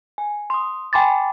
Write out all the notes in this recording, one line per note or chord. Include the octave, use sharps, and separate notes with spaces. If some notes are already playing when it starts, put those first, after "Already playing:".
G#5
C6 D#6
G5 G#5 B5 C6 D6 A6